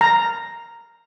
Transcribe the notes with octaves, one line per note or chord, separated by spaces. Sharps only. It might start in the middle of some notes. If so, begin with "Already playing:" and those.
A#5